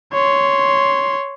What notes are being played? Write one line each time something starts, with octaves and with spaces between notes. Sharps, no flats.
C#5 C6